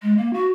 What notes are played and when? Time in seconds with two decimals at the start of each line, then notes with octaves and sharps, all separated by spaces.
0.02 G#3
0.17 A#3
0.33 F#4